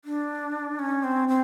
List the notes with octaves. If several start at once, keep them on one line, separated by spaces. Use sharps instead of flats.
D4
C#4
C4
C4